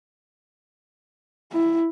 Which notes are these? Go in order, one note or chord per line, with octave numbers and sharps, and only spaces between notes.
E4